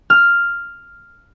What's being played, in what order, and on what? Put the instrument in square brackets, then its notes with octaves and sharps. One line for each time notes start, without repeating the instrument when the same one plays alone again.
[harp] F6